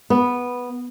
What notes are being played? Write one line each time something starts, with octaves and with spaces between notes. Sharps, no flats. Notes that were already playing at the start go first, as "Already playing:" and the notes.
B3